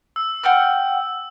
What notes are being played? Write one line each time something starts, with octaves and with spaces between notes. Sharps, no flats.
E6
F#5 G5 F6